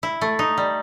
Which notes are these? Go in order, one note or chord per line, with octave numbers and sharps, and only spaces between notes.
E4
A3
D#4
G3